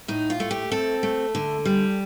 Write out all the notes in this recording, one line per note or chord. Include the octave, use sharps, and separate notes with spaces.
A2 D#4
F4
A3
G4
C4 A4
A3
D3
G3